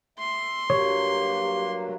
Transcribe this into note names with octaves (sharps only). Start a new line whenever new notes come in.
E5 C6
G2 F#3 A#3 G4 C#5